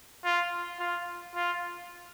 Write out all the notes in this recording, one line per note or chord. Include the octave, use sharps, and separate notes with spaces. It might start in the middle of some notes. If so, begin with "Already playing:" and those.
F4
F4
F4